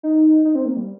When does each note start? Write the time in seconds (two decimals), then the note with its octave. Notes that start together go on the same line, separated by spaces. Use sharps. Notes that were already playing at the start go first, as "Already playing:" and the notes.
0.03 D#4
0.45 D#4
0.55 C4
0.66 A#3
0.77 G3